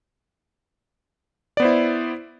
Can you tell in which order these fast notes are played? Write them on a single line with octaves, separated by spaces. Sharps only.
D5 B3 C5 E4